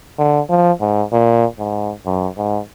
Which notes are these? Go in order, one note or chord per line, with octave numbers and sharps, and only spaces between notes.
D3
F3
G#2
A#2
G#2
F#2
G#2